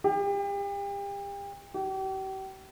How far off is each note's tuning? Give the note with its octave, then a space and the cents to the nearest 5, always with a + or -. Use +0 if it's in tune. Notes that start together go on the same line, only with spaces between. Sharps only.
G4 +35
G4 -40